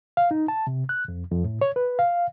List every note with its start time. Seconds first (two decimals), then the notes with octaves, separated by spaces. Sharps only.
0.17 F5
0.31 D#4
0.48 A5
0.67 C3
0.89 F#6
1.08 F2
1.31 F2
1.44 A2
1.61 C#5
1.76 B4
1.99 F5